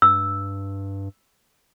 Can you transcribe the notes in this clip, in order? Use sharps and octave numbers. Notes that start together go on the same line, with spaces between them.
G2 E6